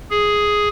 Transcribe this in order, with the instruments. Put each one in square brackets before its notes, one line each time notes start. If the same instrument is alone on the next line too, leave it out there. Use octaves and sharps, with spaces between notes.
[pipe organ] G#4